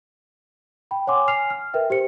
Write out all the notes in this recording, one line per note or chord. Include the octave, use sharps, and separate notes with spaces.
G5 B5
C#5 F#5 G#5 C6 D6
G#5 F6 C7 F7
F6
A#4 B4 E5 G5
G4 C5 C#7